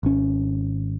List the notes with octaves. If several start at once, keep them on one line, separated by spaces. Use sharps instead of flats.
G#1 C#4